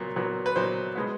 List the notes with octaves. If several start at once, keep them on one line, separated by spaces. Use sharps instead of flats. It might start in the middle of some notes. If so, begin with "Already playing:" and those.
Already playing: A#2 F#3 B3
A#2 F#3 B3
B4
A#2 F#3 B3 C5
B2 G#3 B3